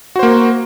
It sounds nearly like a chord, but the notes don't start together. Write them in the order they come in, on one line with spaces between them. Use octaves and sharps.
F#4 C5 A#3